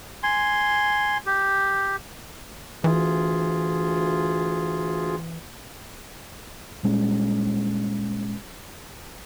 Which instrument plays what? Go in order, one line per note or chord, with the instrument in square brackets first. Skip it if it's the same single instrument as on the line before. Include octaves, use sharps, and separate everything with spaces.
[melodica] G#5 C6
G4
[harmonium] D2 F4 G#4 [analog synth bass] E3
[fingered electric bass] A#2 G3 G#3 C#4